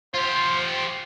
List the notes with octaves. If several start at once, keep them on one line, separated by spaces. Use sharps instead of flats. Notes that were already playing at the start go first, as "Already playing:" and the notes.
F4 G4 C5